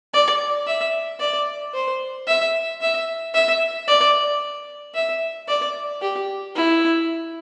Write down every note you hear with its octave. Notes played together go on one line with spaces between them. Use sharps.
D5
E5
D5
C5
E5
E5
E5
D5
E5
D5
G4
E4